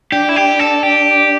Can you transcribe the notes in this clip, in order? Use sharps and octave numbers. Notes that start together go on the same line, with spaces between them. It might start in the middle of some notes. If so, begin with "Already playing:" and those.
D4 G4
E4
G4
A4
G4